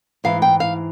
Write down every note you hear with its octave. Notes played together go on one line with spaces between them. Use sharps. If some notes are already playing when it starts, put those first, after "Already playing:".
G#2 E3 G#3 F5
G5
F5